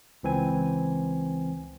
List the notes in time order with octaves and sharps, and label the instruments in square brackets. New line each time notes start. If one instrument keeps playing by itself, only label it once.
[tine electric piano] C#2 E3 C4 G#5